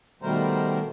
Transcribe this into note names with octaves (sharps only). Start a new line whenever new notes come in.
B2 D#3 G3 A3 A#4 C5